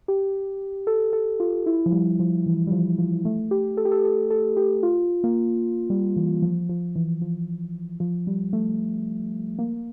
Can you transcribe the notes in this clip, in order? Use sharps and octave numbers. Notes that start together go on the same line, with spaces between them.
G4
A4
A4
F4
E4
F3
G3
F3
E3
G3
F3
F3
A3
G4
A4
G4
A4
A4
A4
G4
F4
A#3
G3
E3
F3
F3
E3
F3
F3
G3
A3
A#3